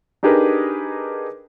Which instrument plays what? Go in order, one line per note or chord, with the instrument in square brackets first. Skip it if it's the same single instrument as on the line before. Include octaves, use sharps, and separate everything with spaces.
[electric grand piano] D4 D#4 G4 G#4 A#4 B4